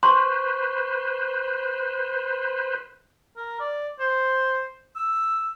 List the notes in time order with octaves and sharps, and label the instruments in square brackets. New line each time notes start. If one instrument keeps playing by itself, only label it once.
[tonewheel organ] B4 C5 [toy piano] C6 [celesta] C#6
[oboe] A#4
D5
C5
E6